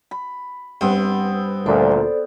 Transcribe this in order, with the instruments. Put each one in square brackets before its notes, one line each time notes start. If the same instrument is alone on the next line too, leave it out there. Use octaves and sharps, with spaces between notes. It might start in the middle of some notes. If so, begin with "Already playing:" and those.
[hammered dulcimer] B5
[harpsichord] G2 [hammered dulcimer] B3 C4
[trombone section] D2 A#2 [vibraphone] A4 C5 D5